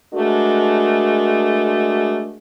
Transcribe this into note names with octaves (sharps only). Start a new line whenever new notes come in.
G#3 A3 D4 F#4 A#4